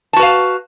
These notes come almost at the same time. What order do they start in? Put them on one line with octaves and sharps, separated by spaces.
A5 F#4 B4 F5